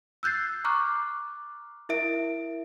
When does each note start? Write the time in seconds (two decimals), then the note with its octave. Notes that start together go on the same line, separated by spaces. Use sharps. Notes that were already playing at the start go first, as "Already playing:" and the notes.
0.23 E6 F#6 G6 A6 C7
0.64 A#5 C#6 D6 F6 F#6
1.89 E4 A#4 E5 D7